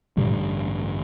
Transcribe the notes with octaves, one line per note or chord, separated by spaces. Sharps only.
A1 G2 A#2 D3 G3
G#2